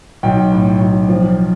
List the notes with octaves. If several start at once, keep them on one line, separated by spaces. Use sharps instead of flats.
B1 G5
A2
B1
F3